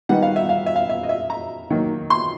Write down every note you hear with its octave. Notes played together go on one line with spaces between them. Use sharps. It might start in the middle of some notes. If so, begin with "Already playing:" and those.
D#3 G3 B3 D#4 F#5
F5
E5
F5
E5
F5
E5
D#5
E5
A#5
D#3 F#3 A#3
C6